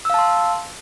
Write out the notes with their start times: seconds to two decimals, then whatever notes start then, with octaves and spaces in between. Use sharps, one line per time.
0.05 E6
0.10 F5
0.14 A5
0.19 C6